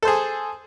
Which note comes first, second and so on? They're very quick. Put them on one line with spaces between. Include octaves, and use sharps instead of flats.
A4 C5 G#4